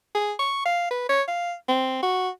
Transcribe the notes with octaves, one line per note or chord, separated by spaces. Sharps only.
G#4
C#6
F5
B4
C#5
F5
C4
F#4